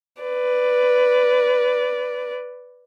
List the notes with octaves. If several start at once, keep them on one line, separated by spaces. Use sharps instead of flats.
B4 D5